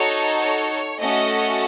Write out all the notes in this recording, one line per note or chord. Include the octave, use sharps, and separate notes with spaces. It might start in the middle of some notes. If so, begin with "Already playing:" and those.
Already playing: D#4 F#4 A4 C#5
C#5
A3 C#4 F#4 A4 D#5